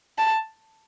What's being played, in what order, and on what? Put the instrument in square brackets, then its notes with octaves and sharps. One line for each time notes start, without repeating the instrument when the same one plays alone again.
[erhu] A5